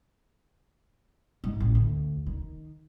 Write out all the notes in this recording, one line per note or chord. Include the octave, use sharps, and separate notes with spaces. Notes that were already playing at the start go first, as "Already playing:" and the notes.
G#2
A1
D2
D#3